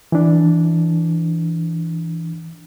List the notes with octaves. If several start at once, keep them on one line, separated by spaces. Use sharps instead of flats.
E3 D4